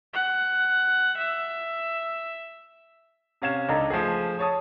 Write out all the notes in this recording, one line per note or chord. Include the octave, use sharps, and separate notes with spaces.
F#5
E5
C3 C#4 F5 G#6 E7
C#2 D4 D#4 A4 A#5
F3 A3 G#4
C#5 A5 D#6